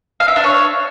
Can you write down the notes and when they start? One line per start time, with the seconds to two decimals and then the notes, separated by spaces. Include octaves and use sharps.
0.20 F5
0.28 E5
0.36 D4
0.44 C#5